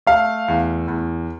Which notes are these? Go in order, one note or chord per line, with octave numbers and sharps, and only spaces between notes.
A3 F5
E2
E2